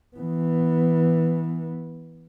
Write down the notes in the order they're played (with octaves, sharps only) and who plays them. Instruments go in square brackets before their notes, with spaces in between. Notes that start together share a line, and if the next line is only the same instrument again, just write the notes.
[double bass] E3 B3